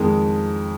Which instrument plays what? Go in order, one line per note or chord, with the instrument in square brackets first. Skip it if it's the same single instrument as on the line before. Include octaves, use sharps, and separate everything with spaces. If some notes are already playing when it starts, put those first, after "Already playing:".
Already playing: [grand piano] F2 D#3 G#3